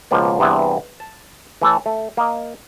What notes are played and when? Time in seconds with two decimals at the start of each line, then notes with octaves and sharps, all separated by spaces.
0.11 C#2 B2 F3 A#3 D5
0.39 E2 G2 C3 B3 E4
1.00 A5
1.62 E3 A3 A4 C#5
1.86 A3
2.17 A#3 D#5